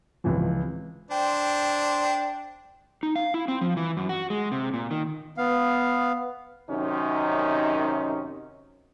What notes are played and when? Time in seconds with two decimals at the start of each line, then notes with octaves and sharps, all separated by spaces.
0.24 C#2 C3 E3 F3
1.11 D4 C5 G5
3.03 D#4
3.16 F5
3.34 E4
3.48 C4
3.61 F3
3.77 E3
3.97 F#2
4.09 F#4
4.30 G#3
4.52 C3
4.74 A#2
4.91 D#3
5.37 B3 F5
6.69 F#2 C3 D#3 C#4 D#4